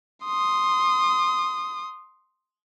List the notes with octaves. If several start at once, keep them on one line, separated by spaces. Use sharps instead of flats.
C6 D#6